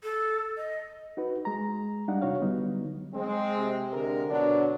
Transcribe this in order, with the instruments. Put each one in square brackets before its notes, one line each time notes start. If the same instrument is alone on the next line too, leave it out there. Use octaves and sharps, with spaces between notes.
[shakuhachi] A4
D#5
[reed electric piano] D#4 F#4 B4
G#3 A#5
G3 D4 D#4 F5 F#5
E2 C3 F#4 C#5 F5
D3 F#3 G3 B3 D#4
[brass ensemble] G#3 C4
[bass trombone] C3
[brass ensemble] D3 G#3 A#4
[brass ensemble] B2 D3 F#3 [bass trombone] D4